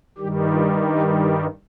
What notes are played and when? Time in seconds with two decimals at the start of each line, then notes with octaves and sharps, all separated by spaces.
0.18 G2 D#3 G3 G4
0.51 F4
0.83 D#4